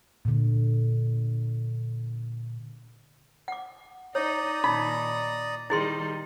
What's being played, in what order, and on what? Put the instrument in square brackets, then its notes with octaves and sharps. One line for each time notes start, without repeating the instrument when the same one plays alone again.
[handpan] A#2 D3
[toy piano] F#5 D6
[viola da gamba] D#4 [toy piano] C#5 [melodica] D5 A#5 D#6
[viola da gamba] A#2 D#3 [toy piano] D#4 [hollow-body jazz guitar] B5
[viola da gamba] D#3 G3 [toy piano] E4 G#4 C6